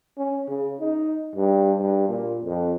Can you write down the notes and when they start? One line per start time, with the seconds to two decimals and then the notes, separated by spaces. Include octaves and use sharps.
0.17 C#4
0.48 C#3
0.80 D#4
1.36 G2
1.78 G2
2.09 A#2
2.44 F2